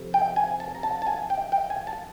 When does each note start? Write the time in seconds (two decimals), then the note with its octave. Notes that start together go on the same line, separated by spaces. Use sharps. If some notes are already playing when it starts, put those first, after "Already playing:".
Already playing: F2 C3
0.14 G5
0.36 G#5
0.60 A5
0.75 A#5
0.83 A5
1.02 A5
1.07 G#5
1.30 G5
1.52 G5
1.70 G#5
1.87 A5